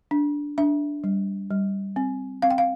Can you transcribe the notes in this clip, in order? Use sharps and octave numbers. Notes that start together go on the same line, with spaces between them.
D4
D4 E5
G3
G3
C4
C4 F5
G5
F5